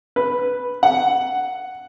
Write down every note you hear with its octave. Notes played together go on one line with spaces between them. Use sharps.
B4
F#5